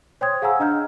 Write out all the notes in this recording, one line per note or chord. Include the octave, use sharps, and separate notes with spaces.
C5 C#5 G5 C6 D#6 G#6
G#4 F5 F#5 G#5 A#5 E6
D4 D#5 A#5 F6 G6